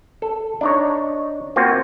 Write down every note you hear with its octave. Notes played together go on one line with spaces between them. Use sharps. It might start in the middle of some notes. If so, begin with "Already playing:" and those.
A4
D4 D#4 C#5
A#3 C4 F4 F#4